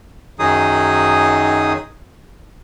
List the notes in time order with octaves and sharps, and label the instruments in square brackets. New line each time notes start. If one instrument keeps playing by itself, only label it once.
[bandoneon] F#2 D#3 F#3 D#4 G#4 D#6